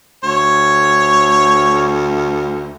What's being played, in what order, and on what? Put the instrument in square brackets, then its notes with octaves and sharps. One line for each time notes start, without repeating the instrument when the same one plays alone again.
[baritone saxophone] D2 [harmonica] C#5